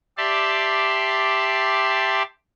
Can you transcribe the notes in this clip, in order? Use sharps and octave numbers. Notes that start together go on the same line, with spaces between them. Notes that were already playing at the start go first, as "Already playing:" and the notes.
G4 D5 E5 A5 C6